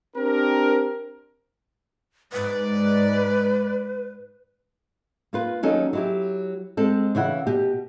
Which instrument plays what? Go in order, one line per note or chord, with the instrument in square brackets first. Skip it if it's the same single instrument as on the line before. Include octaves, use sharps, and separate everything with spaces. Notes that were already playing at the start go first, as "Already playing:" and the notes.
[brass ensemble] C4 D4 G4 A#4
[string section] G#2 D5 [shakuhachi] B4
[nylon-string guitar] A#3 F4 B4
D#2 F#3 C#4 D#4 A4
F#3 E4 G4
G#3 C4 A4
C#3 E3 E4 F#5
B2 G4